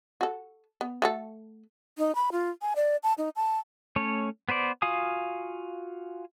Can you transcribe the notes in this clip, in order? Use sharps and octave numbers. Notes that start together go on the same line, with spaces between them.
F#4 A4
B3
A3 F#4 A4
D#4
B5
F4
G#5
D5
A5
D#4
A5
A3 C#4 C#5
B3 B4 C5 D5
F4 F#4 F5 G#5 D#6